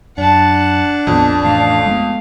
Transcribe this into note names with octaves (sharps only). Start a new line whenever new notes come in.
F#2 D4 F#5 A5
A#1 F2 B3
A1 A3 C#4 F5
G#3 B3